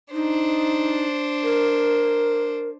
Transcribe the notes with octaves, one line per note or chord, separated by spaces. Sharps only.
D4 D#4 C5
A#4